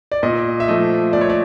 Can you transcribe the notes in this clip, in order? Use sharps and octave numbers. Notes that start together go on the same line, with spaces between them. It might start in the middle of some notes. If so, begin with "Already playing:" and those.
D5
A#2 D#5
E5
F3 A3 D#5
A#2 D5
C#5
D5